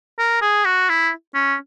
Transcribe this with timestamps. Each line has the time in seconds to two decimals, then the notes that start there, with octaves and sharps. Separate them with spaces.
0.19 A#4
0.42 G#4
0.65 F#4
0.89 E4
1.34 C#4